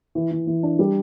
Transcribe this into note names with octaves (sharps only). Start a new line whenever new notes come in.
E3
E3
E3
D4
G3